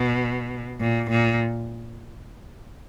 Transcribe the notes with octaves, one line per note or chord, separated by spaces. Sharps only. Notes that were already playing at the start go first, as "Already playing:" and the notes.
Already playing: B2
A#2
A#2